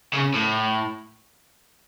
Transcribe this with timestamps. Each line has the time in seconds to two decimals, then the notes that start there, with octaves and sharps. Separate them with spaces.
0.13 C#3
0.34 A2